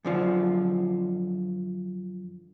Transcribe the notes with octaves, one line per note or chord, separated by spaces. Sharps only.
F#2 D3 F3